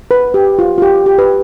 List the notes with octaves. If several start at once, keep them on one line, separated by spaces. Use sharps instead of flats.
B4
G4
F4
F4
G4
G4
B4